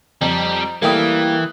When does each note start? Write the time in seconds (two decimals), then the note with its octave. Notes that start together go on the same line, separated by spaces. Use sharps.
0.21 F2 G3 A#5
0.82 E3 G3 A3 A#3 E4 A#4 G5 D#6